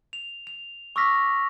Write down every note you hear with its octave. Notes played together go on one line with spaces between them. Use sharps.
F7
F7
C#6 D6 E6 F6 A#6 B6